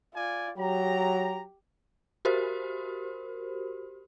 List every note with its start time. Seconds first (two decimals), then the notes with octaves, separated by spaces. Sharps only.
0.15 F4 D5 G#5
0.58 F#3 G4 A#5
2.25 F#4 G4 A#4 C5